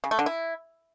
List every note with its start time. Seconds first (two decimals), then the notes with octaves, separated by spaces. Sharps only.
0.04 C#3
0.11 A3
0.19 D3
0.26 E4